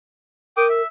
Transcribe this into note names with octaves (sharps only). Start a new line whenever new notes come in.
A#4 G5 D6 D#6
E5